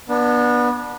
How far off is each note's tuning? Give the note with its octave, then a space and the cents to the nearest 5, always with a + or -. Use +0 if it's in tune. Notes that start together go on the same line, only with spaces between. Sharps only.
B3 -25 D4 +15